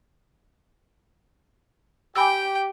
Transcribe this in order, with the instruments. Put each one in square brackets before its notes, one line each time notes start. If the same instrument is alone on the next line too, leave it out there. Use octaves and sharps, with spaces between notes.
[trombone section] G4 [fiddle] G5 [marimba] G#5 B5 E6